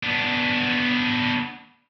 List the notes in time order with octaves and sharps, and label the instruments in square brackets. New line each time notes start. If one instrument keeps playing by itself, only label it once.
[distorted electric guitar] B3 D4